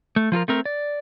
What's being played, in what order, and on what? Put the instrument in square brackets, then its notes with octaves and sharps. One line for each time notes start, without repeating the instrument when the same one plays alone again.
[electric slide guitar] A3
F3 F4 A4 A#4
A3 C4 A#4
D5